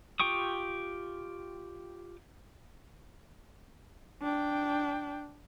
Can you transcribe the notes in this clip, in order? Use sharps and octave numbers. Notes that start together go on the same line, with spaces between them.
F4 G4 G5 C#6 D#6
D4 G5